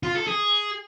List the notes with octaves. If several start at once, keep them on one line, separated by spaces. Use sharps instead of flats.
F4
A4
G#4